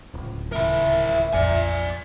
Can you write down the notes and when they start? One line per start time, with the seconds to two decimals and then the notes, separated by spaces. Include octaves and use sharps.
0.14 D1 C#2
0.52 C3 D#3 E4 A#4 E5
1.33 A#1 F2 D5 G#5